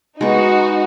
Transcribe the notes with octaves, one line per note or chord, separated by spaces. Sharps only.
G#3 B3 D#4 F#4